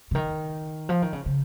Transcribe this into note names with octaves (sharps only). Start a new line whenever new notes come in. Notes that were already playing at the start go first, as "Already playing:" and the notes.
C#3
D#3
F3
D#3
C#3
C#3